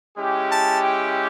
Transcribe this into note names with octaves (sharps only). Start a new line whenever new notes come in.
G#3 C#4 E4 G4
A5
G5